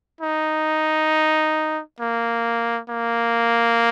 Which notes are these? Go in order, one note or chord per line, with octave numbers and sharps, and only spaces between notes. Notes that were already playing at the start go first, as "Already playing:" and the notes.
D#4
A#3
A#3